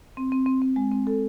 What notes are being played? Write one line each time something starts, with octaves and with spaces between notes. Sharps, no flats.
C4
C4
C4
C4
G#3
C4
A4